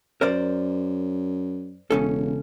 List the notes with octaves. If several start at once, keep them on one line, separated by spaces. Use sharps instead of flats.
F#2 A#4 C5 D5
E1 C#3 C#4 A4